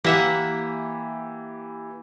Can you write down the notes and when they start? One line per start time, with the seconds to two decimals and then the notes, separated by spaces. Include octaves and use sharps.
0.04 E3 A#3 G4 E5 F#5 B6